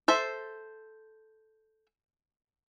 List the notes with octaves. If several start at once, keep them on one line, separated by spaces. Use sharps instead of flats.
A4 C5 E5